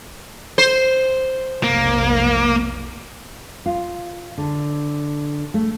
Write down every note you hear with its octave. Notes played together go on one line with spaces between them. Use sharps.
C5
F1 B1 A#3
F4
D3
A3